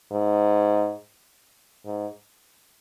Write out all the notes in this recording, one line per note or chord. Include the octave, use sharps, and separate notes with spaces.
G#2
G#2